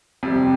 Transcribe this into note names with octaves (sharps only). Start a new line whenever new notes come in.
F2 C3 G3 C4